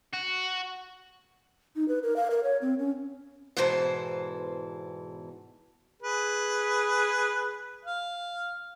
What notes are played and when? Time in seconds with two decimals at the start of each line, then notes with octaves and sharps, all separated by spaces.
0.14 F#4
1.76 D#4
1.88 B4
2.03 A#4
2.16 F5
2.30 A#4
2.44 C#5
2.61 C4
2.79 C#4
3.57 E2 G#2 B2 E3 A4 C5
6.02 G#4 B4
7.85 F5